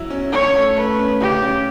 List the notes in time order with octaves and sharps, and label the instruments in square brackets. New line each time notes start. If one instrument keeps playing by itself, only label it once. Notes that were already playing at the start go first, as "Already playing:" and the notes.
Already playing: [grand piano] F#3 E4
C#4
[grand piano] C#4 [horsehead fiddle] C#5
[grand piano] A3
[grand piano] A3 [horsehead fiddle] B4
[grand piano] C#4
[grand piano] C#3 [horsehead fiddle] G4
[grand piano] C#4